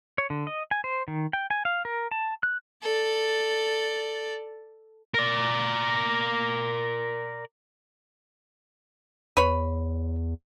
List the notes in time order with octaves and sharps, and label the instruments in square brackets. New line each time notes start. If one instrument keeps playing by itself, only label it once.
[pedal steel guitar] C#5
D3
D#5
G#5
C5
D#3
G5
G#5
F5
A#4
A5
F#6
[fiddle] A4 D5
[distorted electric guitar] A#4 D5
[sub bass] E2 [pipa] B4 C#5 B5